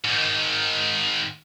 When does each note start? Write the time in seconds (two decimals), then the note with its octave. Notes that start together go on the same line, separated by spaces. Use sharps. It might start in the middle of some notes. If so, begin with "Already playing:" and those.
0.04 G#2 D#3